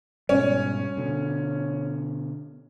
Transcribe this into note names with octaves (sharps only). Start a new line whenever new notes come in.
G#2 B2 G3 C#4
B2 D3